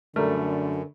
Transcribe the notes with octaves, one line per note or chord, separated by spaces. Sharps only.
F#2 D3 G3 A3 A#4